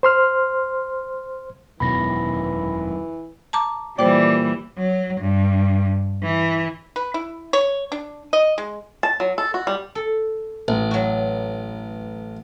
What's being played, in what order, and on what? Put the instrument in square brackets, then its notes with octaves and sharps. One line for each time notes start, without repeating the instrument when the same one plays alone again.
[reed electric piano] C5 C6 F6
[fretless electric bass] E1 B2 [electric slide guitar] F#2 D#3 F#3 [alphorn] E3 [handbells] B5 A#6
[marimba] A5 A#5 D6
[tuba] A#2 [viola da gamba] E3 G3 [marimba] C5 G5 [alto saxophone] D5
[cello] F#3
G2
E3
[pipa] B4
E4
C#5
D4
D#5
G#3
[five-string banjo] A5
F#3
A4
F#4
G3
[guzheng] A4
[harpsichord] A1
[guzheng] F#3 F#4